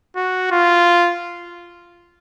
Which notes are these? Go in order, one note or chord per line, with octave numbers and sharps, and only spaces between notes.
F#4
F4